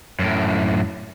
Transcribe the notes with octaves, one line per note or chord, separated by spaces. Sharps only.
F#2 A2